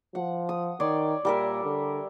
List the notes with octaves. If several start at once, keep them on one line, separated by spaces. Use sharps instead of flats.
F3 F#5
D#6
D#3 C#5 D5 C6
A#2 G3 A#4 E5
D3